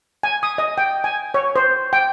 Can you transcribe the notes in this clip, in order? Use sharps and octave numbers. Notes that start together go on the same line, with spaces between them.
G#5
D#6
D#5
G5
G#5
C#5
C5
G5